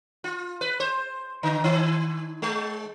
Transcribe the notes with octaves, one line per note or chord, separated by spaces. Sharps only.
F4
B4
C5
D3
D#3
G#3